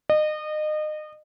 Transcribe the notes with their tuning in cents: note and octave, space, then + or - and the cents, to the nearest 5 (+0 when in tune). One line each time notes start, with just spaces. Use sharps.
D#5 -30